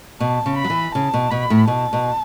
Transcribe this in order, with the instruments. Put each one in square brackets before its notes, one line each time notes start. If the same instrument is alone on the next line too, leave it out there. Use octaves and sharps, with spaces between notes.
[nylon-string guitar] B2 [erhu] A5
[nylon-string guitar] C#3
[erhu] B5
[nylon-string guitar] F#3
E3
[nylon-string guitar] C#3 [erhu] A5
[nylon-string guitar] B2
[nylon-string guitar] B2 [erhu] B5
[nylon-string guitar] A2
[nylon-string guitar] B2 [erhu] A5
[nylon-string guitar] B2